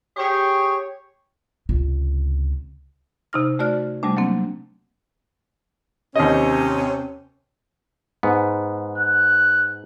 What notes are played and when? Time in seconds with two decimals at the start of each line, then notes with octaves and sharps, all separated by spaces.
0.17 G4 G#4 C#5
1.69 C#2 C3
3.33 C3 D#4 F6
3.59 A3 F#4 D5 F6
4.03 C3 G3 A3 D4
4.17 F#3 A#3 C4
6.16 D#2 C3 C#4 D#5
8.23 G#2 B3
8.98 F#6